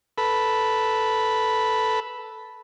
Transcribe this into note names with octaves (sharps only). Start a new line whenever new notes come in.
A4 B4 B5